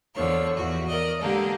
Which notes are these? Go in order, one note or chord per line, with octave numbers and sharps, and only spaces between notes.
E2 D3 F3 C#5
E2 F#4
A#4 D5 D#5
D3 G#3 A#3 G4 A4